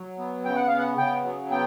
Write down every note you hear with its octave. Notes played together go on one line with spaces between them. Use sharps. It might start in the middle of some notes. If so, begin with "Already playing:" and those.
Already playing: F#3
B3
C#3 G5
F#5
B3 F5
F#5
C#3 G5
F#3
B3 G5